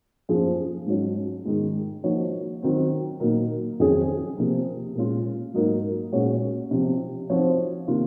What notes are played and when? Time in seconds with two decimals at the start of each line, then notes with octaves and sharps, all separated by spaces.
0.29 F#2 F3 A#3 F4 G#4
0.87 G#2 F#3 C#4
1.45 G#2 D#3 G#3
2.03 F3 A#3 D#4 F#4 C#5
2.62 D#3 F#3 C4
3.20 A#2 F#3 A#3 D#4 A#4
3.79 F2 D#3 F#3 C#4 G#4
4.38 C3 F3 A#3
4.95 A#2 G#3 C#4 F4
5.54 G#2 F#3 A#3 D#4 A#4
6.12 A#2 G#3 C#4 F#4 C#5
6.71 C3 F3 C4
7.30 F3 C4 D#4 F#4 C#5
7.88 C3 D#3 A#3 F4